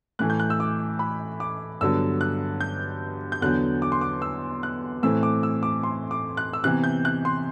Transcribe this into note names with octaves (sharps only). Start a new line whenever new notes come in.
A2 E3 A3 F#6
G6
F#6
E6
D6
B5
D6
G2 D3 F#3 B3 E6
F#6
G6
G6
E2 D3 F#3 B3 F#6
D6
C6
D6
E6
F#6
A2 E3 A3 C4 E6
D6
E6
D6
C6
D6
F#6
E6
C3 E3 B3 F#6
G6
F#6
C6